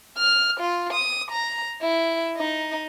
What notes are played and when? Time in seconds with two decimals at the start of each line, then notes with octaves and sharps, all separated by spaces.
0.18 F6
0.60 F4
0.93 D#6
1.31 A#5
1.82 E4
2.37 D#4